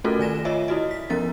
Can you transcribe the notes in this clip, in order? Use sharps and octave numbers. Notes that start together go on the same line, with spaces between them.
A3 C#4 F4 F#4 A4 A#4
D#3 G#5 A#6 E7
F4 C#5 D#5 E5
E4 F#4 D#5
B6
F3 B3 C#4 A#4 A6